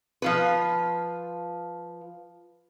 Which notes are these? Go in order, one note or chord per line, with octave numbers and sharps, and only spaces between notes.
F3 F4 B4